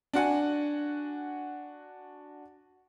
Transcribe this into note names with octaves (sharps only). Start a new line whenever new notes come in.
D4 F#4 F#5 G#5